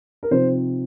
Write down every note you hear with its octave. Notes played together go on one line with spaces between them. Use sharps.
A#4
C3 F3 C4 D#4 C5